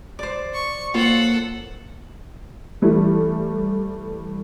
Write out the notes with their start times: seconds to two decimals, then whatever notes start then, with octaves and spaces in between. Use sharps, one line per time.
0.19 C5 D5
0.54 C#6
0.94 A#3 F4 A4 C5 C#5 F#5
2.82 E3 G3 A3